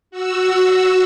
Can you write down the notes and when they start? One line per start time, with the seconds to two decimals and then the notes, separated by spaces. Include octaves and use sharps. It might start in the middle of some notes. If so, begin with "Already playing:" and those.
0.11 F#4 E6